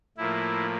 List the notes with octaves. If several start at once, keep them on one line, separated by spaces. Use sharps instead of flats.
A2 F3 A#3 E4